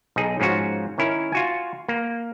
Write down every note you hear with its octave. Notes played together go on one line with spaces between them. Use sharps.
B1 D#4 G#4
G#2 F3 C#4 F4 F#4
D#3 C#4 E4 A#4
F4 F#4 G#5
A#3